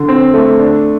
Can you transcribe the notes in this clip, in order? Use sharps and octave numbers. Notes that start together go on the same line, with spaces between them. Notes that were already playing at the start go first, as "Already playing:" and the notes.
Already playing: D3
C4
A3
D4